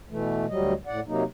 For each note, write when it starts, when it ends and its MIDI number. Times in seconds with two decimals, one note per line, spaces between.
0.10 0.46 47
0.10 0.46 52
0.10 0.46 57
0.49 0.73 38
0.49 0.73 54
0.49 0.73 55
0.49 0.73 75
0.86 1.00 45
0.86 1.00 74
0.86 1.00 78
1.07 1.23 48
1.07 1.23 54
1.07 1.23 58
1.07 1.23 63